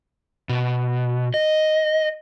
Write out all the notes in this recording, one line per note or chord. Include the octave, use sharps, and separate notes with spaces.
B2
D#5